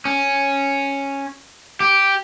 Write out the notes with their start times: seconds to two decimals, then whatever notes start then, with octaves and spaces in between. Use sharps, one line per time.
0.05 C#4
1.80 G4